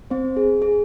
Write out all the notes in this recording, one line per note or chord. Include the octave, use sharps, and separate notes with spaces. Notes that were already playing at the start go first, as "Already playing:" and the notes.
C4 C5
G#4
G#4